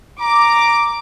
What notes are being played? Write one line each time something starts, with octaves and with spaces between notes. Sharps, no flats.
A#5 D6